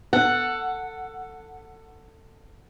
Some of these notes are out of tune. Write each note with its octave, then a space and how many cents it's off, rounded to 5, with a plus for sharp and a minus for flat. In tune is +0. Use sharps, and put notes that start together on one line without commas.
A4 +20 F#5 +0